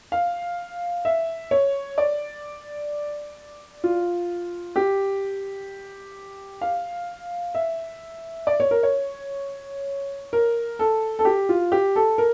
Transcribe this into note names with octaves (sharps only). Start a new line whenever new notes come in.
F5
E5
C#5
D5
F4
G4
F5
E5
D5
C#5
A#4
C#5
A#4
A4
A4
G4
F4
G4
A4
A#4